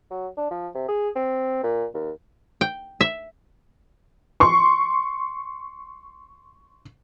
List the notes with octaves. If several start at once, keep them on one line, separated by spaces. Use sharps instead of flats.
F#3
D4
F3
C3
G#4
C4
A#2
D#2
G5
E5
C6 C#6